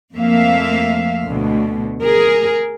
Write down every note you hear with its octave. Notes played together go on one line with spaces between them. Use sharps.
F2 A3 A#3 C4 E5 F5
D2 B2
G#4 A#4